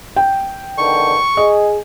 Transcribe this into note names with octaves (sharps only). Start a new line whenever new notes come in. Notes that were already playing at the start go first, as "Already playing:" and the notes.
G5
E2 D3 D#3 C#6
G#4 D#5